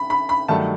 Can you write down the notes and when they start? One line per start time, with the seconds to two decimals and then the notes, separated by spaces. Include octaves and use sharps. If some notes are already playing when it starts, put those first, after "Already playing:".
Already playing: B5
0.10 B5
0.29 B5
0.48 G2 D#3 F#3 A3 A5